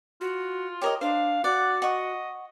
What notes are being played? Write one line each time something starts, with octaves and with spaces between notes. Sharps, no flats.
F4 F#4
G4 A#4 C#5 D#5
D4 C5 F5
F#4 D5 F#5
D#5 F#5 C#6